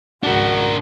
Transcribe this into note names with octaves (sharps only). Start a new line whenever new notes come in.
G#1 C#2 D4 F#4 A#4